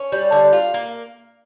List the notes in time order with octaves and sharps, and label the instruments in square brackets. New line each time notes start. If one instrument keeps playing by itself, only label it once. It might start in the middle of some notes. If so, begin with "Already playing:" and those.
Already playing: [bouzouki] C#4
G3
D3
F4
A#3